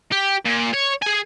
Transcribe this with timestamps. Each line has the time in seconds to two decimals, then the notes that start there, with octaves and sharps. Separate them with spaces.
0.12 G4
0.45 A#2
0.73 C#5
1.02 G#4 G#5